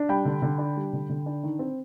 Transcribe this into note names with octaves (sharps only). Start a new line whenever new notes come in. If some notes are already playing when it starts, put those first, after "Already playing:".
Already playing: D4
G3 G5 B5
D3
D3
D4
G3
D3
D3
D4
D#3
C4